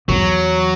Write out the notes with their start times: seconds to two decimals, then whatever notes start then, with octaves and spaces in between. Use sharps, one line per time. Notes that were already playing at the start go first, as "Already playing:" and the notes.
0.08 E2 F#3